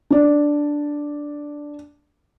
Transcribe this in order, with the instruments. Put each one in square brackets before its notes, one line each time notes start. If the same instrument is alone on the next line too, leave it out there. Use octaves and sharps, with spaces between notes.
[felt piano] D4 D5